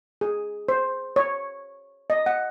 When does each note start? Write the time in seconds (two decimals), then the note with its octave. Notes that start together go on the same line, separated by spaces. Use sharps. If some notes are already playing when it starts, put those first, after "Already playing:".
0.21 G#4
0.69 C5
1.16 C#5
2.10 D#5
2.26 F#5